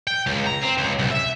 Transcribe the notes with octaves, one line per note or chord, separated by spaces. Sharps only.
G5
C#2
A#5
C4
C#2
C2
E5